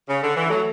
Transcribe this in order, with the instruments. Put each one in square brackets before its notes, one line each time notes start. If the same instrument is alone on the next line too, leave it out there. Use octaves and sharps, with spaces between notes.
[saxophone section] C#3
D3
E3
[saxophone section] F#3 [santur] A3